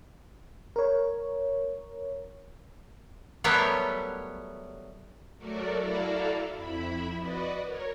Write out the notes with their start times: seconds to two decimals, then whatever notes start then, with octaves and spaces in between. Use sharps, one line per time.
0.76 A#4 C#5
3.44 F#3 G3 A3 B3 A#4 C#5
5.38 F#3 A3 F#4 A4 A#4 D5
5.80 E4 F#4 A4 D5 F5 A#5
6.55 F2 E4 E5 B5
7.19 F#4 B4 D5 D#5
7.64 A#4 C#5